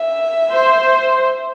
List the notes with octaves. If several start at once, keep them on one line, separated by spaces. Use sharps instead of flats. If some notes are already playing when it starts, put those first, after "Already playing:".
Already playing: E5
C5